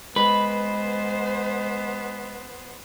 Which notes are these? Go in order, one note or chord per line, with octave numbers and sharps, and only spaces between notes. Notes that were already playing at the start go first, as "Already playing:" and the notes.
G#3 B3 B4 C5